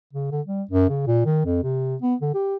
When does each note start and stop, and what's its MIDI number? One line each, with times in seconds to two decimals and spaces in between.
0.14 0.28 49
0.32 0.41 50
0.47 0.63 55
0.71 0.86 42
0.89 1.06 49
1.07 1.24 46
1.25 1.45 51
1.45 1.61 41
1.64 1.96 48
2.02 2.15 59
2.22 2.32 50
2.34 2.56 67